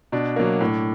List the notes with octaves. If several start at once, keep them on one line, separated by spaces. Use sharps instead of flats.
B2 D4
F#3 A#3
A2